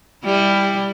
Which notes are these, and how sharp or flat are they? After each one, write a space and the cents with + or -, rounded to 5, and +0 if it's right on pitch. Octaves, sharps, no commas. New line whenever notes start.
G3 +10 E4 +0